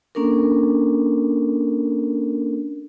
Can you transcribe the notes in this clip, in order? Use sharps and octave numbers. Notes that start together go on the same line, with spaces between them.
A#3 C#4 D4 A4 A#4